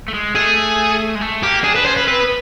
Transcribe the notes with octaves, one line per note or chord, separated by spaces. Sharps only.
A3
G#3
A3 G#4
G#3
A3
A#3 G4
D4 G#4
B4
C#4 C5
B4
C4 B4
B3